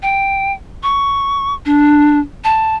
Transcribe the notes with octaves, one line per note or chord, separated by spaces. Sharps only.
G5
C#6
D4
A5